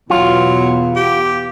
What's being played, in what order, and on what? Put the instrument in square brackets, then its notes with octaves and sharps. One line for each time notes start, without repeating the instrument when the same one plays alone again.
[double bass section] E2 B2 B3 [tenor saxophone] F#3 [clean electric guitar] F4
[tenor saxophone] G4